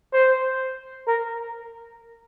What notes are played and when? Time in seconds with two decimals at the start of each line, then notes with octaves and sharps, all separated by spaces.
0.14 C5
1.07 A#4